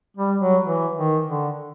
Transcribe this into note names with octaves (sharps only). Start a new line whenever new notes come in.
G3
F#3
E3
D#3
D3